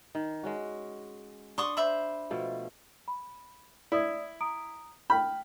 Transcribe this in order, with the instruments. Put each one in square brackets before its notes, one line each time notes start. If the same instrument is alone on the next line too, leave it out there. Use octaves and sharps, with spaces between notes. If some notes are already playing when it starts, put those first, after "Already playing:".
[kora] D#3
G#3 C#4 F#4
[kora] D4 [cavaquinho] C6 C#6 D#6
[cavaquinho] C5 E5 B5
[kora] B2 F3 A3
[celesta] B5
[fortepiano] E4 [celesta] D5 D#6 G#6
[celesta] A#5 D#6 D7
[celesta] G5 F6 G6 [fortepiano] B5